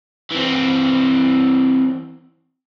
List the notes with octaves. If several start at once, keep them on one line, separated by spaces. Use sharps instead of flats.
E3 C4